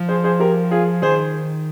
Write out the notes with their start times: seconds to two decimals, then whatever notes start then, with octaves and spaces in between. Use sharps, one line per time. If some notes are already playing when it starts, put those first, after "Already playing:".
Already playing: F3
0.09 G#4 C5
0.24 G#4 C5
0.40 G4 A#4
0.71 F4 G#4
1.02 D#3 G#4 C5